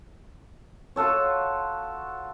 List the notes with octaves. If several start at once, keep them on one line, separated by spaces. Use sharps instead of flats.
F4 F#4 A4 C#5